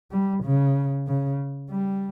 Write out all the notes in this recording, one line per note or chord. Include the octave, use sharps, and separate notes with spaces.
G3
C#3
C#3
G3